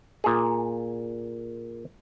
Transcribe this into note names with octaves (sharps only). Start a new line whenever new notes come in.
A#2 G#4